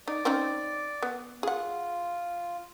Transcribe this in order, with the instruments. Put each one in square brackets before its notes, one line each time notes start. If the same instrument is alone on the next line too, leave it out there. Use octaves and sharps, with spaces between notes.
[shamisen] D#4 [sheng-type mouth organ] D5
[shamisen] C4 C#4 D#4
B3
[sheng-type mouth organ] F4 [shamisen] G#4 F#5